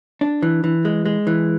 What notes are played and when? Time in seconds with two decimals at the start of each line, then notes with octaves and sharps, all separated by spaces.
0.21 D4
0.42 E3
0.64 E3
0.85 G#3
1.06 G#3
1.27 E3